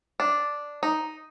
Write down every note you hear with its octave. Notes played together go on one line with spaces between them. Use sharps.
D4
D#4